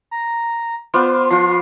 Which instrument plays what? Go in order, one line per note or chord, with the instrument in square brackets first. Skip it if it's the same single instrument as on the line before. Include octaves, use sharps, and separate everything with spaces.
[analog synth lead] A#5
[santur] B3 F4 D5 [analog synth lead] C5
[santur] F3 F4 [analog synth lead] C7